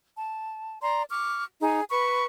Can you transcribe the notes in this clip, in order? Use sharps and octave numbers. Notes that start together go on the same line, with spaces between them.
A5
D5 A#5 C6
C#6 D6 F6
D#4 G#4
B4 B5 C#6